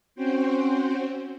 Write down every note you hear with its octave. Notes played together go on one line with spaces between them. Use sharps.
C4 C#4 F#4 C5 G5